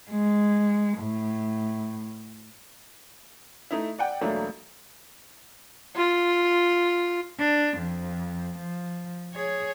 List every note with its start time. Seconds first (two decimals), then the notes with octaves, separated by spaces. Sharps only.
0.11 G#3
0.99 A2
3.71 A3 D#4 E4
3.99 D5 F#5 G5
4.21 E1 F#3 A3 A#3 D4
5.96 F4
7.39 D4
7.78 F2
8.59 F3
9.34 G#4 C#5